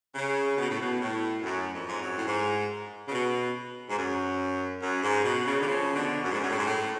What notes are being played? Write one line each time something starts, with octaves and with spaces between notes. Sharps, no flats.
C#3
B2
A2
B2
A2
F#2
F2
G#2
F#2
A2
G#2
C#3
B2
G#2
F#2
F#2
G#2
B2
C#3
D3
C#3 F3
B2 D3
F#2
G#2
F#2
A2
G#2
A2